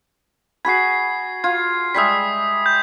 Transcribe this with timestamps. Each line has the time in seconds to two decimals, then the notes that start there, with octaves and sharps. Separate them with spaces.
0.65 F#4 G#4 B5 G#6 C7
1.44 F4 G#6
1.95 G3 G#3 E5 D#6 G#6 B6
2.66 G6